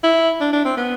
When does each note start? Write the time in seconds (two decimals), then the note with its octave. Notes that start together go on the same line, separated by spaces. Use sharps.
0.03 E4
0.41 D4
0.53 D4
0.65 C4
0.77 B3